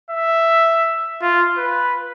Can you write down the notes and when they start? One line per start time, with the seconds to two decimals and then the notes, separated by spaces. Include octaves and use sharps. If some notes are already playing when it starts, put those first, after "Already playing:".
0.10 E5
1.22 F4
1.58 B4